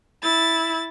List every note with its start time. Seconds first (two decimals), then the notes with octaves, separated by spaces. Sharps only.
0.23 E4 A6